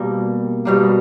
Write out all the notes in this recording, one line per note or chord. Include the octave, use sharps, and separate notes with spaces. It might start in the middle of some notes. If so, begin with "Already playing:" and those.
Already playing: B2 G3 A#3
B2 G3 A#3